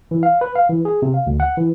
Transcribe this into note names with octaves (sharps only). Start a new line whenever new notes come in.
E3
F5
B4
F5
E3
G#4
C3
F5
D2
F#5
E3